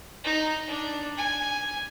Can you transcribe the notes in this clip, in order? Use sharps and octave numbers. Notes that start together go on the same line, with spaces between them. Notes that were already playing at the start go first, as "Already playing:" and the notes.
D#4
D4
G#5